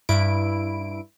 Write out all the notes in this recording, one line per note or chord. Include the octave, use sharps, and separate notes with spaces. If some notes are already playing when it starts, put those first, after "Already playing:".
G2 E4 D7